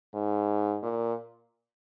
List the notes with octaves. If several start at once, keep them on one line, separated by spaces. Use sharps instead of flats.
G#2
A#2